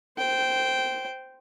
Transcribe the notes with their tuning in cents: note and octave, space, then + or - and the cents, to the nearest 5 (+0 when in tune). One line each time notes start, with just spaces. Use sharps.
C5 -5 G5 -10